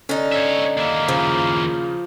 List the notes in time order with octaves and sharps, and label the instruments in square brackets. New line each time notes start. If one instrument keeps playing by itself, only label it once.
[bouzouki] D3 D#4 [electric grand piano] C#4
[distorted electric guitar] C#5 E5
[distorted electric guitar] D#2 E4 [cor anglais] A#3
[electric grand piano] C#3 [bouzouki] F3